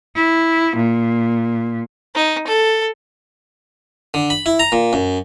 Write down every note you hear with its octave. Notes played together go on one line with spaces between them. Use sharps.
E4
A#2
D#4
A4
D3
B5
E4
A#5
A#2
F#2